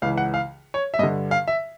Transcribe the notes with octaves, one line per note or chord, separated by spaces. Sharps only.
C#2 C#3 E3 F5
F#5
F5
C#5
E5
G2 D3 D#5
F5
E5